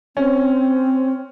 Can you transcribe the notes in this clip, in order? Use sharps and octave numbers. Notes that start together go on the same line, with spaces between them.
C4 C#4